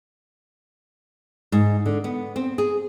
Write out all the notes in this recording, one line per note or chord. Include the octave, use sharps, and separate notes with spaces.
G#2
D3
B3
C4
G#4